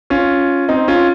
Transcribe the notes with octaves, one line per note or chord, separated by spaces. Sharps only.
C#4 F4
C4 D#4
C#4 F4